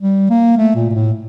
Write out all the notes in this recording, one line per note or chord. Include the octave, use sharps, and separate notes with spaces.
G3
A#3
A3
A#2
A#2
A2